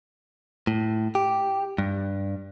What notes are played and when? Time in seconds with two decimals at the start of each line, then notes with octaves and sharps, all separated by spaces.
0.67 A2
1.15 G4
1.78 G2